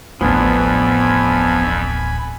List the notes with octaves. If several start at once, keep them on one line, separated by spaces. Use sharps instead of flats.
D1 A1 F2 F3 B3 D4 G#5 B5